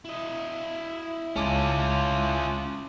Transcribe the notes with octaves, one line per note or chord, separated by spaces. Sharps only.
E4 D#5
C#2 G#3 C#4 F4 A5 D6